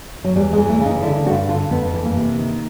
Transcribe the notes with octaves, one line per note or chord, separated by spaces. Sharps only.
F#3
E2 G3
G#3
E3
A3
C#3
D#4
D3 E4
G2 F#4
D3 F4
F2 B3
E3
A#3
C3
D#3